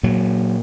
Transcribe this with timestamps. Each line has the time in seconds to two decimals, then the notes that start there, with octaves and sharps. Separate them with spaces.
0.03 A#2 F#3